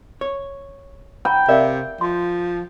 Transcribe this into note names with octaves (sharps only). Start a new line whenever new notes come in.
C#5
G5 A#5 B5
C3 A#4 D5 E5 F5
F3 C6